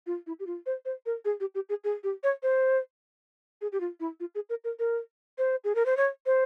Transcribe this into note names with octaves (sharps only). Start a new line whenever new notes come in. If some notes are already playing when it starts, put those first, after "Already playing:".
F4
E4
G4
F4
C5
C5
A#4
G#4
G4
G4
G#4
G#4
G4
C#5
C5
G#4
G4
F4
E4
F4
G#4
A#4
A#4
A#4
C5
G#4
A#4
C5
C#5
C5